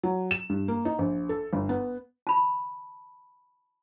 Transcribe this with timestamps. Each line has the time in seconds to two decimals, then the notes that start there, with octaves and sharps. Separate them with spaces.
0.03 F#3
0.31 E7
0.50 G2
0.68 A#3
0.85 D#4
0.99 A#1
1.29 A4
1.53 G1
1.69 B3
2.27 A5 B5